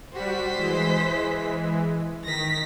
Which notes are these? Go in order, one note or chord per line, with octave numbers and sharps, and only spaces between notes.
G3 F#4 C5 B6
E3 G#3
D#3 A#6 B6